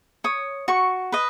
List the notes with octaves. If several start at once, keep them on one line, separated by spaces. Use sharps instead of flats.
C#5 D#6
F#4 C#6
B4 D#5